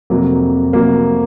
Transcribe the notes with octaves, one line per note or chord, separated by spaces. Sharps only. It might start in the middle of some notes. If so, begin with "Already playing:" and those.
F2 C3 F#3 A#3
F2 C3 F#3 A#3